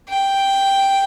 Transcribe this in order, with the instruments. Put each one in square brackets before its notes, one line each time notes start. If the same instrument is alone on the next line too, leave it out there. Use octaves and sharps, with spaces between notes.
[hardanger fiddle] G5